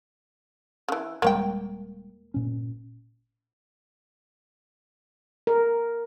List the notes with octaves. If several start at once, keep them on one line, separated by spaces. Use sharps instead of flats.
C#3 E3
D#1 G3 G#3 A#3 C#5 G5
G1 A#2 C#4
A#4